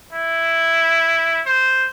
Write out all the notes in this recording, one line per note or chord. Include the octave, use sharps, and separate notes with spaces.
E4
C5